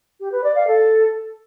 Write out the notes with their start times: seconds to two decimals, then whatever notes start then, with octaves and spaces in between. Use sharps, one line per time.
0.20 G4
0.32 B4
0.44 D5
0.55 F5
0.67 A4